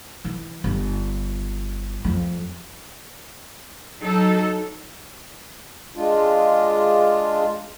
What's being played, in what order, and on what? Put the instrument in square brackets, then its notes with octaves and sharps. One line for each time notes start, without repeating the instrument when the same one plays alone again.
[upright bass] E3
G1
F2
[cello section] F#3 D#4 A4
[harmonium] G#3 D4 F4